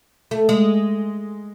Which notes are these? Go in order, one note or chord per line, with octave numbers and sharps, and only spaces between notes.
A3
G#3